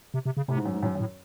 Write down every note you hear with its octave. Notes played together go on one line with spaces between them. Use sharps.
C3
C3
C#3
A2 C3
G#2
F#2
G#2
F#2 A2
F#2
A2